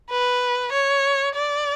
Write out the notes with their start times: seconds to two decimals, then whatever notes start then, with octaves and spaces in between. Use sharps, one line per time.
0.11 B4
0.72 C#5
1.35 D5